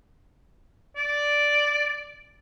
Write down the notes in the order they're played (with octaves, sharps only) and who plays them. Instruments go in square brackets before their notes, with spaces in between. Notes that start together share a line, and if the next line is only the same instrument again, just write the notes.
[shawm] D5